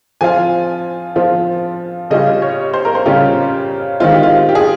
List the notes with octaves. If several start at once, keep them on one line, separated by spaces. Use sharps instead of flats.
F3 C4 F4 G#5
F3 C4 F4
C#3 G3 C#4 F4 D#5
C#5
C5
A#4
C5
C#3 G3 C#4 F4 G4
D#3 G#3 C4 F4
G4
F4
G4
G#4